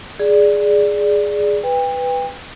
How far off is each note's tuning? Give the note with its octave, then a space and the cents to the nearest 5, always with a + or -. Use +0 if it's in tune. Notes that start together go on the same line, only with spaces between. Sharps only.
G#4 +0 D5 +0
B4 +10 G5 +35